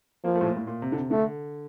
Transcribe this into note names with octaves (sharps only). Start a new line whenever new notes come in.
F3 A#3
A3
A2
A#2
A2
A#2
C3
D3
C3
D3 A3